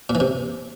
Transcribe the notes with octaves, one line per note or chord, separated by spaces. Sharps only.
A#2
E3
C3